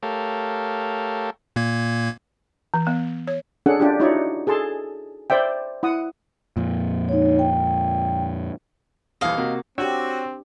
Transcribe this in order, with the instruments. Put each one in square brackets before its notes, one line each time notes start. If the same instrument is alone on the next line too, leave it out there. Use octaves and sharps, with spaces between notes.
[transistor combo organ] A3 G4 A4 A#4 C#5 F5
[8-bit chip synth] A#2 A#3 G#6
[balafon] E3
B3
C#5
[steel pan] C#4 D4 G#4 A4 F#5
D4 F4 G4
D#4 E4 F#4 C#5 D5 E5
G#4 A4 A5 C6
C5 D5 E5 G5
E4 F#5 D#6
[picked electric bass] F2 A#2
[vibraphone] D#4 C#5
G5
[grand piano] D#1 D#2 E3 [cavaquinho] D#5 F5
[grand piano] C3 A#3 F#4
[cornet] C4 [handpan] D4 G4 [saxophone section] F#4 [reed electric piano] C#5 G5 E6